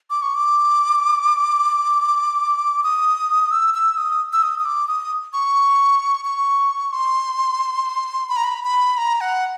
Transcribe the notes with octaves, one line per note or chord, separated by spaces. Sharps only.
D6
C#6
D6
D#6
E6
E6
D#6
E6
D#6
D#6
D6
D#6
C#6
C#6
C6
B5
A#5
B5
B5
A#5
F#5